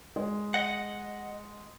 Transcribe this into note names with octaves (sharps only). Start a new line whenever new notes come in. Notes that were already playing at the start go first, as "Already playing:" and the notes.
G#3
D#5 F#5